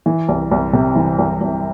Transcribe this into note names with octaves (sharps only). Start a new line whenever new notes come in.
E3
C2
C2
C3
E3
C2
C2